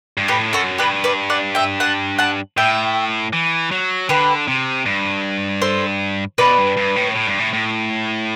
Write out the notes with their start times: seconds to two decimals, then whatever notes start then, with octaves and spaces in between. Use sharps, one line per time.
0.17 G2
0.28 A2 G4 B4
0.53 F#2 F#4 A4
0.78 G2 G4 B4
1.04 B4 D5
1.30 D5 F#5
1.55 E5 G5
1.80 F#5 A5
2.19 F#5 A5
2.57 A2 E5 G5
3.33 E3
3.71 F#3
4.09 D3 G4 B4
4.48 C3
4.86 G2
5.62 A4 C5
6.38 B2 B4 D5
6.58 G2
6.77 G2
6.96 A2
7.15 A2
7.27 G2
7.39 A2
7.53 A2